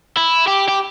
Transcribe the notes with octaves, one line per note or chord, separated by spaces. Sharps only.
E4
G4
G4